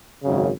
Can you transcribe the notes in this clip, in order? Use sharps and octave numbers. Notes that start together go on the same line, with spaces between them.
G#1 F#2 C#3